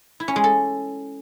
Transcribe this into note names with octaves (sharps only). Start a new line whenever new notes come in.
E4
C#4
G#3
A4